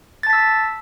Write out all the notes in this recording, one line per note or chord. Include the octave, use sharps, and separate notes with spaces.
A5 E6 A6 B6